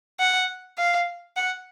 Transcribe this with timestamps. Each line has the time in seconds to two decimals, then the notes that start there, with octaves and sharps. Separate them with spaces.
0.20 F#5
0.78 F5
1.36 F#5